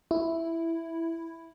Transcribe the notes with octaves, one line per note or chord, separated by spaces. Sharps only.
E4